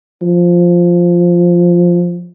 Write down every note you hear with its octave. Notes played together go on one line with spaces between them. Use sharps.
F3